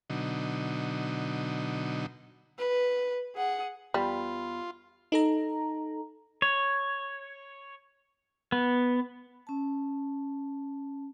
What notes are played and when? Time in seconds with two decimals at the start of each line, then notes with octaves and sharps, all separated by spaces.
0.10 B2 D3 F#3 D#4
2.58 B4
3.36 G#4 F#5
3.94 E2 G3 B3 F4 B5
5.12 D#4 A4 A#5
6.42 C#5
8.52 B3
9.47 C#4 A5